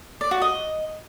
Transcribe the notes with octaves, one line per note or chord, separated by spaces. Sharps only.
D5
F#4
D#5